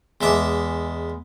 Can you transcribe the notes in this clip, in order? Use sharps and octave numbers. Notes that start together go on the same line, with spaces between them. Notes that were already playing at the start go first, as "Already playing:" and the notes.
E2 G#3 E5 A5 D6